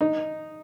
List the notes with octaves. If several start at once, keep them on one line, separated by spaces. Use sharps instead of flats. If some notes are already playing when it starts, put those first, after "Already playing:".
D#4